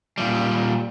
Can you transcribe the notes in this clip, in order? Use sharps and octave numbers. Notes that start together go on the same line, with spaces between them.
A#2 G3